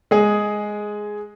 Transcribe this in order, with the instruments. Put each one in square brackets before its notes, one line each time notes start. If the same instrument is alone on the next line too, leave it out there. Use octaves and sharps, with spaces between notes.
[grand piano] G#3 G#4